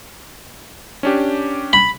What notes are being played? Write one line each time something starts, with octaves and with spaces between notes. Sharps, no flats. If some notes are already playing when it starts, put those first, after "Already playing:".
C#4 D4 G4
B5